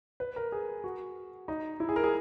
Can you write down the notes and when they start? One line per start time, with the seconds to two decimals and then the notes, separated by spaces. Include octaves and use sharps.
0.20 B4
0.36 A#4
0.52 G#4
0.84 F#4
1.48 D#4
1.80 E4
1.89 G#4
1.96 A#4
2.04 G#4